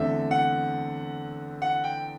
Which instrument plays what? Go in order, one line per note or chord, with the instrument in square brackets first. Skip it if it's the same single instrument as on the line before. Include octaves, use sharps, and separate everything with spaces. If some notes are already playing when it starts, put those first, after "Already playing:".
Already playing: [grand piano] E2 D3 A3 C4 E5
F#5
F#5
G5